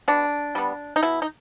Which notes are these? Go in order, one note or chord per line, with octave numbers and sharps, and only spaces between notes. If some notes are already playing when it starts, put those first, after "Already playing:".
B2 D4
G3 B3
D#4
B2 E4
D#4